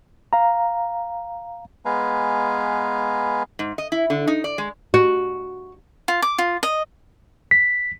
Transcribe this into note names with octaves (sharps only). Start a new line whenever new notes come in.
F5 A#5
G#3 B3 B4 F5 G#5 A#5
G#2
D#5
E4
D3
D#4
D5
G#3
F#4
F4
D6
F4
D#5
B6